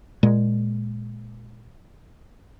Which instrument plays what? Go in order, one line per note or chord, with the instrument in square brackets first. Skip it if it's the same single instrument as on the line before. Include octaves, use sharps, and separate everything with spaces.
[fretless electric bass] A#2 G#3